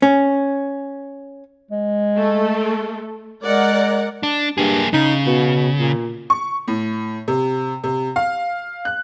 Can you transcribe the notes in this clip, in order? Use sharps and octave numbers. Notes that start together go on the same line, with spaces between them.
C#4
G#3
A3 A4
G#3 A#4 D5 F#5
D4
G2 A#3 G#4
C#3 D#4
B2
A#2
C#6
A2
C3
C3
F5
F#6